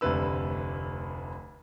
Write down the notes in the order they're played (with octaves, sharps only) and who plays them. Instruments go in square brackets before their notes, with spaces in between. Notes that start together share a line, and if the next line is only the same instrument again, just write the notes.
[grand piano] F1 D2 C3 D4 B4 E6